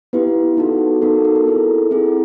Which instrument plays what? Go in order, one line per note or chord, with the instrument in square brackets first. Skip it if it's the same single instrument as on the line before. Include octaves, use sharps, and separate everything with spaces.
[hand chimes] B3 E4 G4 B4
B3 D#4 F#4 A4
B3 D#4 F#4 A4 A#4
A4
A#4
A#4
C4 E4 G#4 A4
C4 E4 G#4